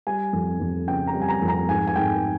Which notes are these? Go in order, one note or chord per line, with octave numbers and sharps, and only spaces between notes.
G3 G#5
F2
F2
C#3 G5
A#5
G3
G#5
A#5
F2
A#5
G#2 G#5
G#5
G#2 G5